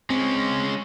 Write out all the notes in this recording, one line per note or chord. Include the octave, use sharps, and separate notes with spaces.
G#3 C4 C#4